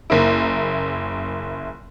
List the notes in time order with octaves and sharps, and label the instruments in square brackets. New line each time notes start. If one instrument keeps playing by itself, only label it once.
[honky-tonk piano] F#1 A#3 E4